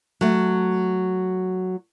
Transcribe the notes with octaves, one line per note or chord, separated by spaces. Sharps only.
F#3 A3